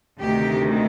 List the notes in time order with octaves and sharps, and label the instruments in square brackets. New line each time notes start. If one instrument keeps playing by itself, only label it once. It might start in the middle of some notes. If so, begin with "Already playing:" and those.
[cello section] D2 C3 D#3 G4